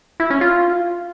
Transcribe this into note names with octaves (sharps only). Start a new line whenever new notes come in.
E4
C#4
F4